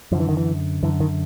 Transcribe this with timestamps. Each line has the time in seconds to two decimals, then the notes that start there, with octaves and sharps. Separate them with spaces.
0.12 F#2 F3
0.15 D3
0.20 E3
0.29 D#3
0.37 E3
0.83 F#2 D3 E3
1.00 D#3